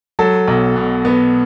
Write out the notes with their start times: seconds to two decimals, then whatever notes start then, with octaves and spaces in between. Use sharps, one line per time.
0.19 F#3 A4
0.48 B1
0.76 B2
1.05 B3